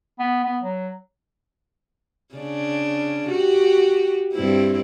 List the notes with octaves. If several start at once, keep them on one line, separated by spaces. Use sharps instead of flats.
B3
B3
F#3
C#3 D4
F#4 G4
G2 C4 E4